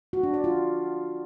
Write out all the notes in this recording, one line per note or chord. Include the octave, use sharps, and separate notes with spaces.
F#4
D4
D5
F4